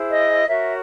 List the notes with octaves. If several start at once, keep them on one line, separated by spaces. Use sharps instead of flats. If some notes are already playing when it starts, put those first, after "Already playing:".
Already playing: E4 G#4 C5
D#5
F#4 A#4 C#5 E5